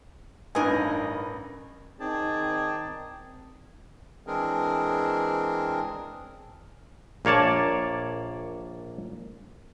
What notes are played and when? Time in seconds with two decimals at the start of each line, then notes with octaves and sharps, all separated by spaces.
0.55 A1 G2 D#4 A#4 B4 G#5 D#6
2.00 D#3 C4 D#4 G#4 D5 G5 A5
4.27 E3 G#3 C4 D4 G#4 A#4
7.25 A#1 A#3 C#5 D5 A5